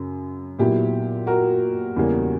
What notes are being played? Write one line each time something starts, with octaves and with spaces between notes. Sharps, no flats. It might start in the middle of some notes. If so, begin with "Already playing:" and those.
Already playing: F#2 C#3
A#2 F#3 B3 E4 G4
F#4 A#4
E2 C#3 G3 A#3 C#4